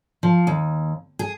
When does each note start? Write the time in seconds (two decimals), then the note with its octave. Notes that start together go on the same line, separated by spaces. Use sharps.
0.23 F3
0.47 D#2
1.19 G#4